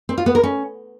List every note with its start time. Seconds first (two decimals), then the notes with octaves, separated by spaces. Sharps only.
0.09 C4
0.18 F4
0.26 B3
0.35 A#4
0.43 C#4